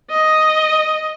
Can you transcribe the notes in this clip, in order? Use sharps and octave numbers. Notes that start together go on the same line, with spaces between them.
D#5